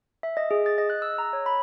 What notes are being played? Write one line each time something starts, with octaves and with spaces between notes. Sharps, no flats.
E5
D#5
G#4
A6
D#5
F#6
E6
A#5
C#5
B5